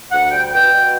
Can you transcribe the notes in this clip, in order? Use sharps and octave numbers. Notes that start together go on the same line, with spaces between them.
D2 F#5
G3 G5
B2 G5
B2